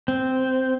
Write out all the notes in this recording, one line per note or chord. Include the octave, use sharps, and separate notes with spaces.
C4